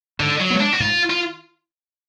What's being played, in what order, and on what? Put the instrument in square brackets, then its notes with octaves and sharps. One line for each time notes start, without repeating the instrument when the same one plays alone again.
[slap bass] G#2 [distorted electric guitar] D3
[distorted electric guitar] F#3
[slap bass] G#3 B3
[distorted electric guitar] D4
F#4
[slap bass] G#2 [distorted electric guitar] F4
[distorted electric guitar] F4